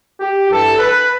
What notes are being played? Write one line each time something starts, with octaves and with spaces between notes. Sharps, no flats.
G4
G2 E3 G3 A4
B4